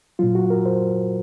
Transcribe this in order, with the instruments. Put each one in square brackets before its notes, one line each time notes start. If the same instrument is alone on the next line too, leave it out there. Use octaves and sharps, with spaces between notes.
[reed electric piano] A#2 F#3 F4
F#4
A#4
C5